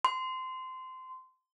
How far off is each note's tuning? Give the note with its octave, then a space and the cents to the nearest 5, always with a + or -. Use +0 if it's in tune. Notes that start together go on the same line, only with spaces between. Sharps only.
C6 -20